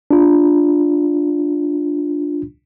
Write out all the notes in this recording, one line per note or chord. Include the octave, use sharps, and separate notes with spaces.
D4 F4